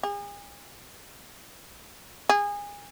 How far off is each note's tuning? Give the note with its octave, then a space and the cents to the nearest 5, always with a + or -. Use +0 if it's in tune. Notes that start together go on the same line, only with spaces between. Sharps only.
G#4 -40
G#4 -25